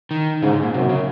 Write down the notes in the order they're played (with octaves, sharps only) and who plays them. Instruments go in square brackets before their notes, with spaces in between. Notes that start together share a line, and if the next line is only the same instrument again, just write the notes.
[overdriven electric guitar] D#3
[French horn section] G#2 [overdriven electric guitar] C#3
[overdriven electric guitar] G#2
A#2
[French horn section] F#2 [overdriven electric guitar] C3
[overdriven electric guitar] C#3